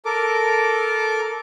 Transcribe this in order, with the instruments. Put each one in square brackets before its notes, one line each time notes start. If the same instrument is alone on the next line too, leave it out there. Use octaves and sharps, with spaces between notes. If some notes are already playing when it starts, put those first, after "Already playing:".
[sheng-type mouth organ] A4 A#4 D6